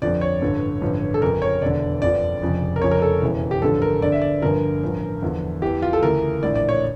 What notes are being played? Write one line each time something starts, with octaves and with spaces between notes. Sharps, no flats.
G1 F2 D3 F3 D5
C#5
A1 G2 D3 F3
A1 G2 D3 F3
A4
G1 F2 C#3 A#4
C#5
E1 E2 D3 D5
G1 F2 D3 F3 D5
F1 F2 C#3 F3
A#4
F1 F2 C#3 F3 C#5
A#4
A4
E1 E2 C#3 E3
G4
A1 G2 D3 F3 A4
A#4
G1 G2 D3 D5
E5
D5
G1 G2 D3 F3 A#4
A1 G2 F3
E2 D3 F3
E2 E3 G4
F4
A4
D2 C#3 E3 A#4
A#1 A2 E3 D5
D5
C#5